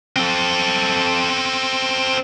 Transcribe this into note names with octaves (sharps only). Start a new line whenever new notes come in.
C4 A4